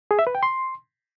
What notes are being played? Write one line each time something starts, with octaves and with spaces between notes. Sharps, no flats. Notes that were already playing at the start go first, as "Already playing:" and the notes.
G#4
E5
B4
G5
C6